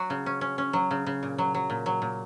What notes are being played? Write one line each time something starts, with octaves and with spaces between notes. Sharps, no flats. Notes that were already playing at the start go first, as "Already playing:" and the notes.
Already playing: F#3 F#4
C#3
C#4
C#4
C#4
F#3
C#3
C#3
A#2
F#3
F#3
A#2
F#3
A#2